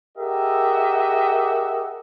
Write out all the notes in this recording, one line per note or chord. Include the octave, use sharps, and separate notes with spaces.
G4 G#4 A#4 D#5 E5 F#5